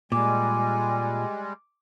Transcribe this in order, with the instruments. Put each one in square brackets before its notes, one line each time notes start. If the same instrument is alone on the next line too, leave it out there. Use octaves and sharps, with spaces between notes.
[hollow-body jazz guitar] A#2 [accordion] G3 G#3 [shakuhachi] G#5 [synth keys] D6